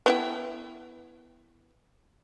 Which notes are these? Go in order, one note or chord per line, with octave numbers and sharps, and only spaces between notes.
B3 E4 G5